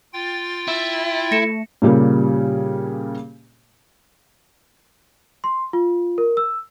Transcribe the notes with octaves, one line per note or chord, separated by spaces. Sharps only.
F4 G5 A6
E4
A3 A#6 C#7 E7
A#2 C#3 G3 A#3 G4
C6
F4
A#4
E6